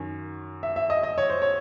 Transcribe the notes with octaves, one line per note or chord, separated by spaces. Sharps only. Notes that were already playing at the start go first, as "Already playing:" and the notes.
Already playing: F#2 D#3
E5
E5
D#5
D#5
C#5
C5
C#5